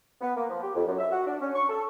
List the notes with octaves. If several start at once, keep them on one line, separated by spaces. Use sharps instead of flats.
B3
A#3
F3
G4
F2
F#2
E5
F#4
D4
C#4
C#6
A4